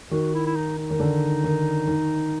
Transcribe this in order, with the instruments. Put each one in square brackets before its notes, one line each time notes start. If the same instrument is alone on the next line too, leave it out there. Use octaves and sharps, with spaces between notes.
[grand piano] D#3 [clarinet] F#4
[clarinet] E4
E4
D#4
D#4
[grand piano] D#3
D3
D#3
D#3